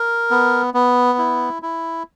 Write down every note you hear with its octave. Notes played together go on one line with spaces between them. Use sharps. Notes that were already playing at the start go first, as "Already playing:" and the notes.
Already playing: A#4
B3
B3
E4
E4